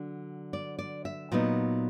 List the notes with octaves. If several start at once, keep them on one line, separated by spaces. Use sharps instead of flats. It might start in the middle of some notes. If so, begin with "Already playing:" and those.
Already playing: D3 F#3 D4
D5
D5
E5
A#2 F#3 B3 D#4